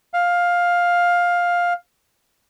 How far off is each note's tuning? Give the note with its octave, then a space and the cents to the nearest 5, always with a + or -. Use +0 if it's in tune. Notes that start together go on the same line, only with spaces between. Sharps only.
F5 +10